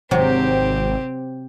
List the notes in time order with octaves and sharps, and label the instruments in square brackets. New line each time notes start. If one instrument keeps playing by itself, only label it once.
[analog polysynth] G#1 [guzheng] C3 F#3 [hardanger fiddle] C4 G4